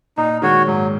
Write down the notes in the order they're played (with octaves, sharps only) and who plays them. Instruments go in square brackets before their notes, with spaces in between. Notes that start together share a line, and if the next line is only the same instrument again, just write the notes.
[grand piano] A#2 [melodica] D#4
[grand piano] A#2
[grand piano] D#3 G#3 [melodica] F#4 C#5
[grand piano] G#2 [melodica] F#3